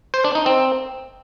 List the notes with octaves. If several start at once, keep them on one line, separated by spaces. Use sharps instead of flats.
C5
D4
D#4
C4